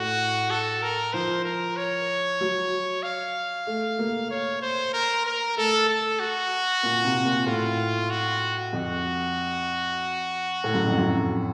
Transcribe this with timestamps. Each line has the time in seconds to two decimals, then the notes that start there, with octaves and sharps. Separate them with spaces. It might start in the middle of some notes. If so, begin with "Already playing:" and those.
Already playing: A2 F#4
0.50 A4
0.82 A#4
1.13 F3 C5
1.45 A#4
1.77 C#5
2.41 F#3
3.03 F5
3.67 A3
3.99 A#3
4.31 C#5
4.62 C5
4.93 A#4
5.25 A#4
5.57 A3 A4
5.88 A4
6.20 F#4
6.83 A#2
7.04 C3
7.25 A#2
7.47 A2 F4
8.11 F#4
8.73 F2 F#4
10.64 A2
10.74 F#2
10.86 F2
10.98 F#2